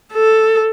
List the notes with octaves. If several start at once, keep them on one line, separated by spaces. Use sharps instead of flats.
A4